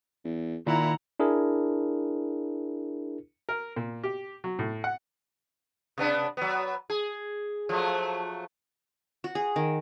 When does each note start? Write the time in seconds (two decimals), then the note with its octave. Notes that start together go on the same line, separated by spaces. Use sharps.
0.25 E2
0.67 A#2 D#3 E4 F#5 A#5
1.19 D4 E4 G#4 A#4
3.49 A#4
3.76 A#2
4.04 G4
4.44 F#3
4.59 A2
4.84 F#5
5.98 C3 B3 D4
6.37 F#3 B3
6.90 G#4
7.69 F3 F#3 A3
9.24 F#4
9.35 G#4
9.56 D#3